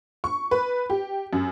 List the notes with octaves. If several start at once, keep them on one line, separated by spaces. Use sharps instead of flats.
C#6
B4
G4
F#2